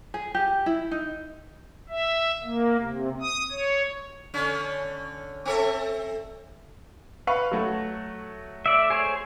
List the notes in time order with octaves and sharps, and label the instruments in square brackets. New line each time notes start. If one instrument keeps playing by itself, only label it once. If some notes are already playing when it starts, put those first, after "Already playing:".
[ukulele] G#4
G4
E4
D#4
[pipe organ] E5
A#3
C3
D#6
C#5
[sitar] D3 C#4
C4 A4 E5
[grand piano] B4 F5 C#6
F#3 A3 F#4
[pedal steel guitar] D5 E5
G#4 C5 C#5